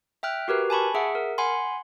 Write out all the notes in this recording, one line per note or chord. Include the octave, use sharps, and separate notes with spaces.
E5 G5 F6 F#6
F#4 G4 A#4 B4
G#5 A5 B5 C#6
G#4 E5 F#5
A#4
F#5 G#5 B5 C6